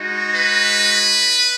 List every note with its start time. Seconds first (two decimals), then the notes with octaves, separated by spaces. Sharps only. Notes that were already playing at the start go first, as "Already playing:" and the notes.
Already playing: G#3 D#4 F#4
0.34 B4